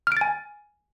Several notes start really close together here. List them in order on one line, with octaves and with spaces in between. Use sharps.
F6 D7 A6 G#5